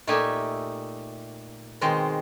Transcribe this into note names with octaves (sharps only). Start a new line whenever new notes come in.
A#2 A3 D#4 G4 E5 G#5
B2 D#3 G#3 C4